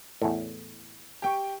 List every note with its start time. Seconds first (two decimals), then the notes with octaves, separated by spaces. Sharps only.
0.22 E2 A2
1.22 G4 G5 C#6